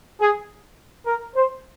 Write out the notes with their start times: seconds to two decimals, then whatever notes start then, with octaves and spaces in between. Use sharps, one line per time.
0.20 G#4
1.06 A#4
1.35 C5